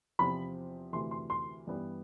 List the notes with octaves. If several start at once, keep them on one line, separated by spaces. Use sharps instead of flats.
E2 C3 F3 C4 B5
D2 C3 E3 C6
C6
C6
G2 E3 G3 B3